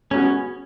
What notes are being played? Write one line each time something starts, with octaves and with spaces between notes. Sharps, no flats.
G#3 B3 C#4 F#4